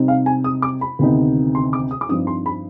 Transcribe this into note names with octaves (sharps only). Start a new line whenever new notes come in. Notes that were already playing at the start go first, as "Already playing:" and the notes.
Already playing: C3 G3 C4 D#4
F5
G#5
D#6
D6
B5
D2 C3 D#3 B3 D#4
C6
D6
D#6
D6
G2 F3 C4 D#4 D#6
C6
B5